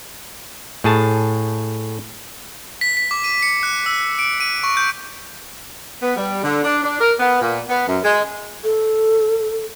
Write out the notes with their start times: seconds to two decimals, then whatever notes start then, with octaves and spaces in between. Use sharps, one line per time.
0.84 A2 G#4 A5
2.81 B6
2.97 B6
3.11 D6
3.24 D#7
3.42 C#7
3.63 F#6
3.86 E6
4.19 D7
4.40 D#7
4.64 C#6
4.77 G6
6.02 B3
6.17 G3
6.43 D3
6.64 D4
6.83 D4
7.01 A#4
7.20 B3
7.41 A#2
7.69 B3
7.87 F#2
8.04 G#3
8.63 A4